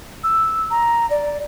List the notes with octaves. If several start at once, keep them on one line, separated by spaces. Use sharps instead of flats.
E6
A#5
D5